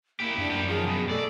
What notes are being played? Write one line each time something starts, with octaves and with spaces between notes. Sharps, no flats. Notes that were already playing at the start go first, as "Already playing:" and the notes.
A#3 E4 G4
F#2 D4
G3 B3
D#3 F3 G#4
B2
A3 A4 D5